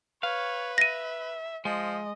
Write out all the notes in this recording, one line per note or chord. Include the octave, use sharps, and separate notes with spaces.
B4 C#5 F5
E5 A#6 D#7
F3 G#3 D#5